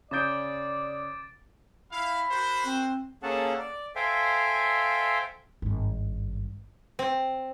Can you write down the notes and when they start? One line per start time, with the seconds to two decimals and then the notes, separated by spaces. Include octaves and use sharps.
0.11 C#3 D5 D6 D#6 G6 A6 D7
1.92 E4 F5 B5
2.30 F#4 A#4 C5
2.65 C4
3.23 A#3 C#4 G#4 A4 F#5 A5
3.59 D5
3.96 A4 C5 E5 F5 G5 G#5
5.62 G#1 G2
6.99 C4